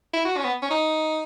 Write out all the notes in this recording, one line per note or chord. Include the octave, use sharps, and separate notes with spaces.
E4
F#4
C#4
B3
C#4
D#4